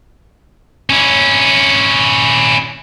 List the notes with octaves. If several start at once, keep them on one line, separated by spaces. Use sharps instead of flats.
C#4 E4